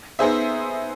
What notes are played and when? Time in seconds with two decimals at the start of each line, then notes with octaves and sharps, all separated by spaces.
0.19 B3 D#4 G#4 C5 E5